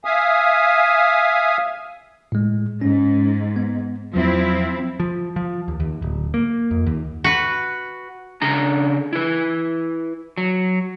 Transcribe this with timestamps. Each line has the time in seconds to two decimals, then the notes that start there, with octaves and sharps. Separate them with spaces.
0.05 E5 F5 G#5 D#6
2.32 A2 G#3
2.81 G#2 C#4
3.56 B3
4.14 E2 F3 F#3 C4 E4
5.00 F3
5.36 F3
5.68 D#2
5.80 D#2
6.02 D1
6.34 A#3
6.71 F2
6.86 D#2
7.24 F#4 B4
8.42 C#3 D4 A#5
9.13 E4 B4
10.37 F#3